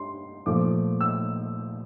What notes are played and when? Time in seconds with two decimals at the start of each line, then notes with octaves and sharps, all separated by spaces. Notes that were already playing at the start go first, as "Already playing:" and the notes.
Already playing: G2 G3 C6
0.46 A#2 F3 A3 D6
1.01 E6